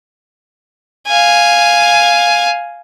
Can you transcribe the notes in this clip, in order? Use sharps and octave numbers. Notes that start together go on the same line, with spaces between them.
F5 G#5